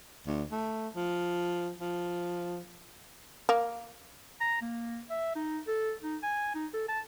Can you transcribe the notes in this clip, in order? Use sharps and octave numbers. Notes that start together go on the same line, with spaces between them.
D2
A3
F3
F3
A#3
A#5
A#3
E5
D#4
A4
D#4
G#5
D#4
A4
A5